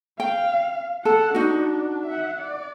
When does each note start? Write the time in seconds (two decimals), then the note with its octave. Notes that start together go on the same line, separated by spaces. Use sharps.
0.20 F5 G5
1.05 A4 F#5
1.35 D4 D#4 F#4
2.07 E5 F#5
2.39 D5